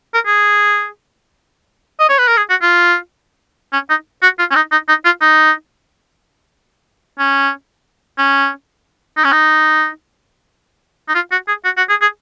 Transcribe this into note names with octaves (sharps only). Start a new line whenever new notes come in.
A#4
G#4
D#5
C#5
B4
A#4
G#4
F#4
F4
C#4
D#4
F#4
F4
C#4
D#4
D#4
D#4
F4
D#4
C#4
C#4
D#4
C#4
D#4
D#4
F4
F#4
G#4
F#4
F#4
G#4
G#4